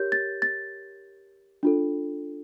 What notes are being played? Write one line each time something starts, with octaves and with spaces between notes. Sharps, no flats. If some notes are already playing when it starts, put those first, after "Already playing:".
Already playing: G4 A#4 C#5 G6
A6
A6
D4 F4 A4